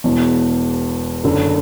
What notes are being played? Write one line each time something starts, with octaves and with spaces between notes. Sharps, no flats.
E1 E2 B2
F#1 F#2 D3